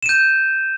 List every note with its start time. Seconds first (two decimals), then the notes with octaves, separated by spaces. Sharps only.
0.03 E7
0.06 D#7
0.09 G6